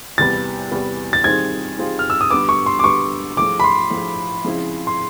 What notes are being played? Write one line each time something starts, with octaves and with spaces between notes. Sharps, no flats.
E2 C3 E3 G3 B3 A6
E2 C3 E3 G3 B3
A6
D#3 G3 C4 F4 G#4 G#6
D#3 G3 C4 F4 G#4
F6
E6
D#6
D3 G3 B3 D6
C#6
C6
D6
D3 G3 B3 C#6
A2 F3 G#3 D6
B5
C6
A2 F3 G#3
C#3 F3 G#3 C4 E4
C6